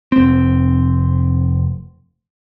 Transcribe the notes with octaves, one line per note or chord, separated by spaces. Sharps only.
F1 C4